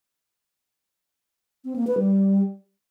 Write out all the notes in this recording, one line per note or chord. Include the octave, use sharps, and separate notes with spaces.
C4
A#3
B4
G3